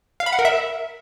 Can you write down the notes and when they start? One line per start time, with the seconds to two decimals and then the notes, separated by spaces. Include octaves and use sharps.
0.20 F5
0.26 B5
0.32 F#5
0.39 A#4
0.45 E5